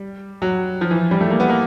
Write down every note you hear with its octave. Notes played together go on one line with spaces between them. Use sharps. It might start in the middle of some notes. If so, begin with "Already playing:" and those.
Already playing: G3
F#3
F3
E3
G3
A3
A#3
B3
A#3